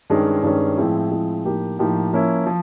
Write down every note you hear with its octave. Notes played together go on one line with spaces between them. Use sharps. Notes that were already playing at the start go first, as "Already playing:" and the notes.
G2 D#3 G#3 C#4
G2 D#3 G#3 C#4
A2 F3 G#3 C4 E4
A2 F3 G#3 C4 E4
A2 F3 A#3 D#4 G4
A2 F3 A#3 D#4 G4
F3 A#3 C#4 E4
F3